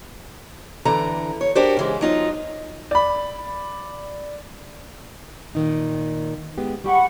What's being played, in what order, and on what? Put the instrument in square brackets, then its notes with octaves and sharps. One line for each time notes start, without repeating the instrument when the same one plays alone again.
[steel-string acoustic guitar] D3 E3 A#5
C#5
D4 F#4 G4 A#4 C5 D5
C#3 E3 G#3
F#3 D#4 F4
[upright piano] D5 B5
[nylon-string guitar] A#2 D#3 D#4
G#3 B3 G4
[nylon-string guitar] G3 G4 [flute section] F#5 B5 C#6